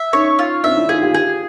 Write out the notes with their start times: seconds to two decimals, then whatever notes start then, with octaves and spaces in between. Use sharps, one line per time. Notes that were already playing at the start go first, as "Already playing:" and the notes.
Already playing: E5
0.13 C#4 D#4 C#5
0.39 F4
0.64 C4 D4 E5
0.77 D4 E4
0.89 D#4 F4 G#4
1.03 F4 G4
1.14 F4 G4 G#4